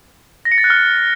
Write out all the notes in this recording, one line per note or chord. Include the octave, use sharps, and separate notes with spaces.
A#6
C#7
A6
F#6
F6